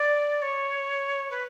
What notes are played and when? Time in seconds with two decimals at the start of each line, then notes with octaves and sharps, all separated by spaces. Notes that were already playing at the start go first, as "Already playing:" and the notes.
Already playing: D5
0.42 C#5
1.30 B4